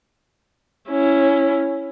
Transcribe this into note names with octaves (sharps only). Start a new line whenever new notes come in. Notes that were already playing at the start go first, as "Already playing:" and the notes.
C#4 E4